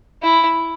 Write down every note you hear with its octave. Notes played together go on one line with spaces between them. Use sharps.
E4